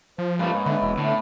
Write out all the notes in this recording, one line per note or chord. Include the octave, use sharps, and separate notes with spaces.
F3 C5
G2 A3 A#3 C#4 B4 F5
G#2
D3 B3 E5
E1 E4
A2 D3